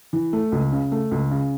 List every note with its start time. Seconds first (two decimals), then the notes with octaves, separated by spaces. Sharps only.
0.13 E3
0.33 A3
0.52 C#2
0.72 C#3
0.92 A3
1.11 C#2
1.31 C#3